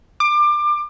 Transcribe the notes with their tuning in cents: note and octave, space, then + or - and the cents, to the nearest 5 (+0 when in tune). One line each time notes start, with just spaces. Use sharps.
D6 +25